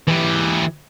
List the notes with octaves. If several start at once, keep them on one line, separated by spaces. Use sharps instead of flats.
E3 G4